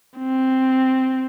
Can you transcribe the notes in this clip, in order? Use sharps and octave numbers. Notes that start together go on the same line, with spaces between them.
C4